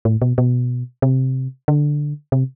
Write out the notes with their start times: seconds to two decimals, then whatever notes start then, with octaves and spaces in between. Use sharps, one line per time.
0.05 A2
0.22 B2
0.38 B2
1.02 C3
1.68 D3
2.32 C3